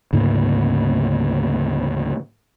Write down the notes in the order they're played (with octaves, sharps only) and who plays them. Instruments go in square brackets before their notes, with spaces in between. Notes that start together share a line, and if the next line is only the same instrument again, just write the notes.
[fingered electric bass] D2 G#2 C#3 A#3